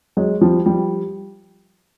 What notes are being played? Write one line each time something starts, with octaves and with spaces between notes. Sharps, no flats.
F#3 G#3
F3 G3
F3 G3